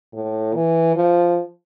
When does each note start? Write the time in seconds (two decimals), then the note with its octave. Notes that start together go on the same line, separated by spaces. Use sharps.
0.13 A2
0.54 E3
0.96 F3